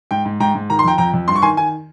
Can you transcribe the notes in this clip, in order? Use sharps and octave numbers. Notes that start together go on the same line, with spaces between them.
G#2 G5
G#2
G#2 G5 A#5
G#2
D#3 A#5
C6
F2 G5 A#5
F2 G5 A#5
F2
G2 C6
C#6
D#3 G#5 C6
D#3 G#5